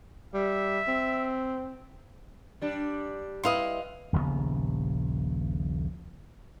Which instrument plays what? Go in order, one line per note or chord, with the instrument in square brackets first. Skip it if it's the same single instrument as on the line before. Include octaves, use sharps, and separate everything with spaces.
[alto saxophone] G3 [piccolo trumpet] E5
[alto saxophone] C4
[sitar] G3 D4
[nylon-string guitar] G3 E4 B4 [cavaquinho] D#5 F5 C6
[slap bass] D#1 A#1 C#3 B3